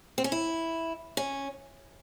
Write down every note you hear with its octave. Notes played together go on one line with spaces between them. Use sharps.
C4
C#4
E4
C#4